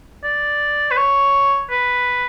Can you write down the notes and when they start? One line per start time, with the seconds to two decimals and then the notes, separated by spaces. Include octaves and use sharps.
0.23 D5
0.91 B4
0.97 C#5
1.70 B4